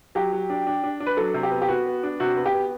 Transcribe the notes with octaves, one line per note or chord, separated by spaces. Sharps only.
F#3 G4
F#3
D4
D4
D4
D4
B4
F#3 A4
C3
G4
B3
G4
B3 F#4
B3
D4
C3 F#4
B3
G4
B3